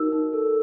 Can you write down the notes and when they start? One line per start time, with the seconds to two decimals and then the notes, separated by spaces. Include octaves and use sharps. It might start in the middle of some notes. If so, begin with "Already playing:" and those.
Already playing: D#4 F#4 A#4 E6
0.13 D#4
0.33 A4